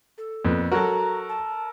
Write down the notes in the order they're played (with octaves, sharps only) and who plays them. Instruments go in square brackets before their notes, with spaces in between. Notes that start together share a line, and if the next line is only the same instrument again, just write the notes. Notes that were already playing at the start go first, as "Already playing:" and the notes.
[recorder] A4
[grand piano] F2 [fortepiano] A#2 B3
[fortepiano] F#3 F#4 [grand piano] A4 A#4 [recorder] A#5
[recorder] A5